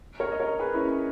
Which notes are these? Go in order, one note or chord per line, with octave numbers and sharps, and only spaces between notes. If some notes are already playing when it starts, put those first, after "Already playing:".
A#4 C#5
D#5
A#4 C#5
G#4 B4
C#4 E4
C#4